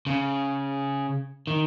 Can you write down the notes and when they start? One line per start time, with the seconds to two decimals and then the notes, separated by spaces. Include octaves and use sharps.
0.07 C#3
1.47 D#3